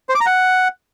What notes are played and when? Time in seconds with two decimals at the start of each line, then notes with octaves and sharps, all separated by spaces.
0.09 C5
0.15 D6
0.20 A#5
0.26 F#5